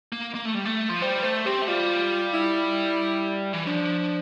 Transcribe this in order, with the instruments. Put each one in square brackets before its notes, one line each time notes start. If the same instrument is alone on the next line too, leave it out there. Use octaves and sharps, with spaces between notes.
[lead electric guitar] A#3
A#3
A3
G3
A3
F3
[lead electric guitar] G3 [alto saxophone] C5
[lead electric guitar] A3 [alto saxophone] C5
[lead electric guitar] C4 [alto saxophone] G4
[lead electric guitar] A3
[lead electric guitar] G3 [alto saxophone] F4
[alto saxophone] E4
[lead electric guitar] E3
[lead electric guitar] F3 [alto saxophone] D4